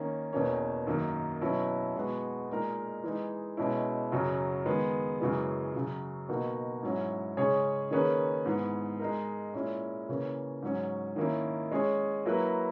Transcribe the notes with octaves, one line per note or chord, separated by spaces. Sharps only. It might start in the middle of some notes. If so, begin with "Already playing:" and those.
Already playing: D#3 A#3 C#4
E2 B2 A#3 C#4
F#2 D#3 A#3
B2 F#3 C#4 E4
B2 G#3 B3 F#4
A#2 G#3 D#4 A#4
E3 G#3 D#4
B2 G#3 C#4 E4
F#2 C#3 F#3 C#4
D#3 G#3 B3
F#2 C#3 E3 G#3
F#2 C#3 F#3
B2 A#3 D#4 F#4
G#2 F#3 C#4 E4
C#3 G#3 C#4 G#4 C#5
D#3 A#3 C#4 G#4 B4
G#2 E3 B3
G#3 D#4 A#4
A#2 G#3 C#4 E4
C#3 E3 A#3 C#4
G#2 F#3 C#4
D#3 A#3 C#4 E4
G#3 C#4 G#4 C#5
F#3 A#3 E4 B4